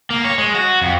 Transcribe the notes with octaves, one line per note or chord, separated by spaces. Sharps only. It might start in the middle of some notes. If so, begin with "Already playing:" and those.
A#3
C#5
G#3
F#4
F2